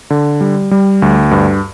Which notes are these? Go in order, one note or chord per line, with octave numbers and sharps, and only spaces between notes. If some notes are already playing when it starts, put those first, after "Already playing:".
D3
G3
G3
D2
G2